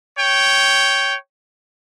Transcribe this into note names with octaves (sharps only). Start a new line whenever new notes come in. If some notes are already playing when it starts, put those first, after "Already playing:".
C#5 G5